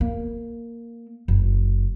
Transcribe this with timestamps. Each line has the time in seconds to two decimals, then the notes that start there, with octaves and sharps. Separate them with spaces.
0.01 A#3
1.28 F#1